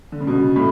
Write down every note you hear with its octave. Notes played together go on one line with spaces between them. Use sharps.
D3
C#3
B2
C#3
A2